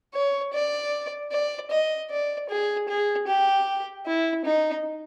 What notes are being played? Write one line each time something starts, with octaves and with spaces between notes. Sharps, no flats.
C#5
D5
D5
D#5
D5
G#4
G#4
G4
E4
D#4